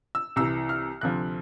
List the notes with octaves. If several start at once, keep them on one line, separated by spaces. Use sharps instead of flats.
E6
C2 C3 E3 E6
F6
D2 C3 F3 F#6